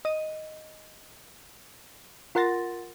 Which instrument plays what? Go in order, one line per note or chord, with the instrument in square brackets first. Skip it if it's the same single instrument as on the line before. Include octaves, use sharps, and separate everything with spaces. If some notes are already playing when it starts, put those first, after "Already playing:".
[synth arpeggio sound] D#5 D#7
F4 A#4 F#5 C6 A6 A#6